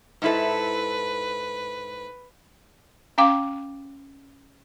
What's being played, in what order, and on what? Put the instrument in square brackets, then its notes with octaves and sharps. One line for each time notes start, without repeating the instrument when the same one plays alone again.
[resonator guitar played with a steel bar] G#2 E4 A4 [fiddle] B4
[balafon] C#4 F5 G5 D6